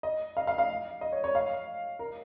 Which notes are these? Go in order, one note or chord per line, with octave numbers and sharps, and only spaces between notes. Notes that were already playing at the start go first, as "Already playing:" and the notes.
D#5
F5
F5
F5
D#5
C#5
C#5
F5
A#4